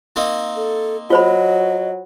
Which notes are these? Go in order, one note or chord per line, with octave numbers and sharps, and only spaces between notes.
A#3 C4 D#4
A4
F#3 F4 C5 D#5 B5